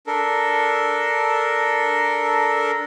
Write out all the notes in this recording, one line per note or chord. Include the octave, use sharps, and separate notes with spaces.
D4 A4 A#4